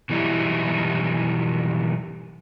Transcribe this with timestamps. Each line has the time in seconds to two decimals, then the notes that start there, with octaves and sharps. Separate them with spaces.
0.10 B2 E3 F#3 G3 D#4 E4